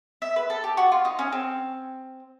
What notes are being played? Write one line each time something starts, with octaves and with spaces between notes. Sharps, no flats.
E5
B4
A4
G4
F#4
F4
D#4
C#4
C4